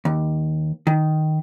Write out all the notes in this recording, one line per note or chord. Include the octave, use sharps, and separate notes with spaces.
D#2
D#3